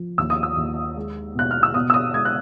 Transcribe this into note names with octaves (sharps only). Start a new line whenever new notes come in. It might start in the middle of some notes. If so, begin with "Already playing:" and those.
Already playing: F3
D#2 E6
D#6
E6
D#2
G#3
B2 F#6
F6
E6
B2 D#6
E6
D#6
G#3 G#6
F#6